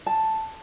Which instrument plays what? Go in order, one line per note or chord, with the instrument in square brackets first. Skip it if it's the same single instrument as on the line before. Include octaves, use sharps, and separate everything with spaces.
[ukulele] A5